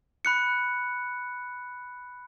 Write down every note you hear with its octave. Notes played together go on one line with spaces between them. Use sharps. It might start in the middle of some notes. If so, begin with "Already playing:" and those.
B5 F#6 C#7